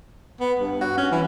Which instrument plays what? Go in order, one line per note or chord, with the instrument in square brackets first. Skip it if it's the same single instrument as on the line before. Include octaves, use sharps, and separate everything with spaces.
[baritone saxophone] B3
G2
F#4
C#4
E3